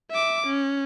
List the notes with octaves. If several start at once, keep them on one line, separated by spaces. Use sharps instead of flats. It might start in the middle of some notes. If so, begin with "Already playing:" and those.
E5 D6
C#4